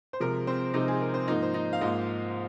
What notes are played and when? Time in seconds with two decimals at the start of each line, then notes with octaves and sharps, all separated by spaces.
0.13 C5
0.20 C3 F3 G#3 A#4
0.47 C4 C5
0.74 C3 F3 G#3 D#4 D#5
0.88 G#4
1.01 A#4
1.14 C4 C5
1.27 G#2 F3 A#3 D#4 D#5
1.42 C5
1.54 D#4 D#5
1.73 F5
1.81 G#2 F3 A#3 D#4 D#5